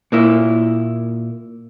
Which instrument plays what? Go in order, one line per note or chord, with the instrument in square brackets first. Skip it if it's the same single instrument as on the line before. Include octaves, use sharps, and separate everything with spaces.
[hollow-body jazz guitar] A#2 A#3 E4